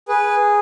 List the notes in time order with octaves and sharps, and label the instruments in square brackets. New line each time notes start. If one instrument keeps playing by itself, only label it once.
[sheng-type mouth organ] G#4 B4